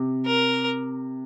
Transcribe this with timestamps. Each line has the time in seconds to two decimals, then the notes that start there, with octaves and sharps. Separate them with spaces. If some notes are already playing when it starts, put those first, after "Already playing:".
Already playing: C3
0.26 A#4